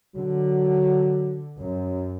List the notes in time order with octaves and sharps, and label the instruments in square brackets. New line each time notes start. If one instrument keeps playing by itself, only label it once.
[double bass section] D3 [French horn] F#3
[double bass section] F#2